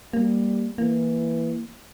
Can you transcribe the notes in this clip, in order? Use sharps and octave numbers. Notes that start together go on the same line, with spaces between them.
G3 A#3
E3 A#3